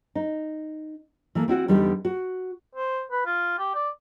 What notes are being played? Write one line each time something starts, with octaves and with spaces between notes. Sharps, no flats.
D#4
E3 A#3 A4
C4 E4 F#4 F#5
E2 D3 G3 B3 D#4
F#4
C5
B4
F4
G4
D5